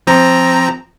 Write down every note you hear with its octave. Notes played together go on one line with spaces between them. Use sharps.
F3 C4 A#5